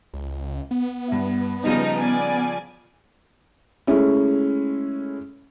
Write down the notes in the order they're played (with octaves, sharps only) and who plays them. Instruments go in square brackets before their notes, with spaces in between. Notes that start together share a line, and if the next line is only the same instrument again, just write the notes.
[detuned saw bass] C#2
B3
[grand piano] G2 E4
[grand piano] C#3 F3 G3 [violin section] D#4
[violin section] D5 G#5
[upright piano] G#3 A3 C#4 E4